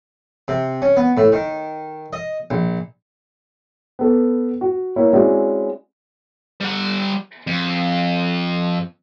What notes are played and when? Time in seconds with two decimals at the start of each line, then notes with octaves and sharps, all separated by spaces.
0.48 C3
0.82 C#4
0.97 B3
1.17 A2
1.32 D#3
2.13 D#5
2.51 A#1
3.99 B3 A4 B4
4.61 F#4
4.96 A#3 E4 C#5 E5
5.13 G#3 C4 C#4 E4 F#4 D5
6.60 G3 F#5
7.47 F2